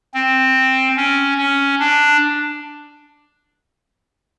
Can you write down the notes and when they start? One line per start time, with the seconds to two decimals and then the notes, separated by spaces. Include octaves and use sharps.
0.14 C4
0.97 C#4
1.38 C#4
1.80 D4